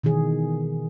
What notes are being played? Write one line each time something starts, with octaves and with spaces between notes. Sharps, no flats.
B2 D#3 E3 G#4